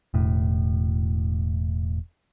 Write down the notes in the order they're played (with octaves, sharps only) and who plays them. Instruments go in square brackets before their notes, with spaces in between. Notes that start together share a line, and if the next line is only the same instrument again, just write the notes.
[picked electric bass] E1 A2